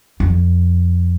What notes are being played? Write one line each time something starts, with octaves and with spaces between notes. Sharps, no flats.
F2